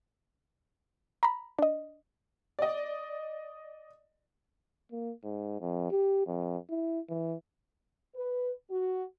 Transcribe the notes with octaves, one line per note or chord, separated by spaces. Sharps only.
A#5 B5
D4 D#5
D5 D#5
A#3
G#2
F2
G4
F2
E4
E3
B4
F#4